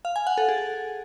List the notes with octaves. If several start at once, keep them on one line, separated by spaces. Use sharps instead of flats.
F5
G#5
F#5
A4
G#4